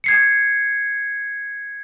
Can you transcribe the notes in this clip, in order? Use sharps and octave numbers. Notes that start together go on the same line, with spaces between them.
G#6 C7 C#7